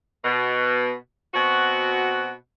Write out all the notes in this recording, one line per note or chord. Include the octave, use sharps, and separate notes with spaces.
B2
B2 C4 F#4